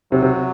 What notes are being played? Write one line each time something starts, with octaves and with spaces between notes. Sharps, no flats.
C3 F#3
C3